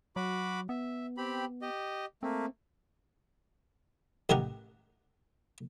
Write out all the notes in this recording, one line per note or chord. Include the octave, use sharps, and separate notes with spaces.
F#3 F#4 B5 D6
B3 E5
C4 G4 B5
G4 D#5
A3 A#3 C4
A1 D#3 G4 A#4 F#5